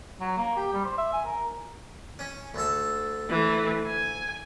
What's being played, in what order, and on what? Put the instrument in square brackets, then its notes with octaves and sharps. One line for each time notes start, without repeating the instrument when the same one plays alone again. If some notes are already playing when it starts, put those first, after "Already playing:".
[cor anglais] F#3
A#3
G4
G3
C5
E5
G#5
A#4
[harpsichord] C#4
D2 A4
[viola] E3 A3
G#5